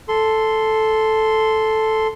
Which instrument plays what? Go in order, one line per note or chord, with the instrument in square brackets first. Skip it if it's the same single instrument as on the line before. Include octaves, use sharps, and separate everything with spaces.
[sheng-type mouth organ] A4 C6